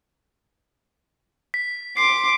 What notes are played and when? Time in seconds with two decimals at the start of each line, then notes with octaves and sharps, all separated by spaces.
1.54 B6
1.97 C6 D6 C7 D7